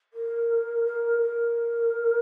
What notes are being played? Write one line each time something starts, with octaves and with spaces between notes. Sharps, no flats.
A#4
A#4
A#4